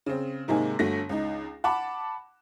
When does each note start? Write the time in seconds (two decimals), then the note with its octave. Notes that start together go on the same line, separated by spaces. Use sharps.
0.06 C#3 C4
0.48 G#2 C3 D#3 G#3 A#3 G#4
0.79 G1 D3 A3 F#4 A#6
1.09 C#2 D#4
1.64 F#5 A5 B5 D6